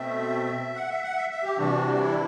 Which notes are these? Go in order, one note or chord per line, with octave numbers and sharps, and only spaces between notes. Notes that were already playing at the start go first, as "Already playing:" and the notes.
Already playing: B2 A3 C4 E5
F#5
E5
F#5
E5
E5
G4
C3 E3 G3 D4 F#4
F#4
E4